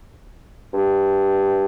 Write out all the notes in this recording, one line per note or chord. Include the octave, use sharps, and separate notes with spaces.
G2